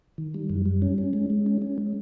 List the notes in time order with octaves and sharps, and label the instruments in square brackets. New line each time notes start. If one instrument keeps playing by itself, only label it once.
[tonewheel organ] D#3
G3
F#2
G3
C#4
C#4
G#3
G#3
C#4
C#4
G#3